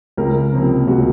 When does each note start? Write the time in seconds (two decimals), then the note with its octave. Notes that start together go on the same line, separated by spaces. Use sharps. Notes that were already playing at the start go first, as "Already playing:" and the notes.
0.17 C#2 A#4
0.53 C3 F3 A#3
0.87 C#2 F#4